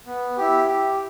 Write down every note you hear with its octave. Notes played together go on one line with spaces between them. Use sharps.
B3
E4 G4
G4